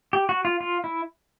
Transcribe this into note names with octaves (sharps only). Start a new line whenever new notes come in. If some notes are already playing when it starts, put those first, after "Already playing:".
G4
F#4
F4
F4
E4